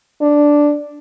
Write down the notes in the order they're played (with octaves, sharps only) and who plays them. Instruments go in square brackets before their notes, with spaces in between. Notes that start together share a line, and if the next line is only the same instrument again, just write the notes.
[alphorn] D4